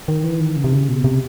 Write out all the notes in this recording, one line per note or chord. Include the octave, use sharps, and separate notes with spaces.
D#3
E3
D#3
C#3
C3
C#3
B2
C3